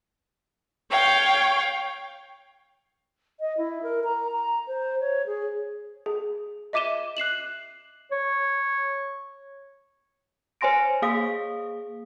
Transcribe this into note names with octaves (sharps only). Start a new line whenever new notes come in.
C#5 F5 G5
D#5
E4
A#4
A#5
A#5
C5
C#5
G#4
G#4
D#5 E5 D6 D#7 E7 G7
F#6 C7 E7 F#7
C#5
C5 C#5 G#5 C6 A#6 D7
A#3 G#4 F5 D#6 B6